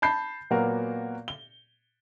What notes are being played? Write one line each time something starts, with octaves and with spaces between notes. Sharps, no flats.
A5 B5 G6 C7
A#2 F#3 A#3 B3 F#4 A#4
G7